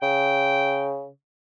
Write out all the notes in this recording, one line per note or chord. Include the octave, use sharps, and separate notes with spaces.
C#3 G5